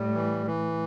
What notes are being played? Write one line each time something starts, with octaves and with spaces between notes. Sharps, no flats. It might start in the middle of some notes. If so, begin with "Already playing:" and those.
Already playing: A2 G3
E3
E3